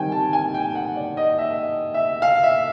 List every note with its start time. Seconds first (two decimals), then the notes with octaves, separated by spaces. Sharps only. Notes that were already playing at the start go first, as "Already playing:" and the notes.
Already playing: D#3 G3 C4 G5 G#5
0.12 A5
0.33 G#5
0.54 G5
0.75 F#5
0.96 D5
1.17 D#5
1.38 E5
1.94 E5
2.22 F5
2.43 E5